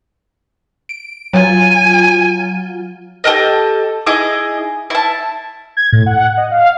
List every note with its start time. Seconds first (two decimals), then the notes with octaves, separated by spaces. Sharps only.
0.89 D7
1.33 F#3 F4 G#5
3.24 G4 A4 A#4 D#5
4.06 E4 G#4 D#5 D6
4.90 E4 A5
5.77 G#6
5.92 A2
6.06 F#5
6.37 D#5
6.51 F5